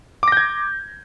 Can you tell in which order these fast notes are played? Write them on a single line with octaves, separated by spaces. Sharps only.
D6 A#6 G6 G#6